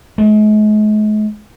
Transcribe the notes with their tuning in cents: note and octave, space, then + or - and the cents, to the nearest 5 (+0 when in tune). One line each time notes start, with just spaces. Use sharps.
G#3 +45